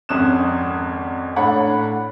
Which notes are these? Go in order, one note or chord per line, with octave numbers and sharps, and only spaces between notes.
G#1 F2 C#4 D#6 F#6 E7
A2 D4 C#5 F#5 B5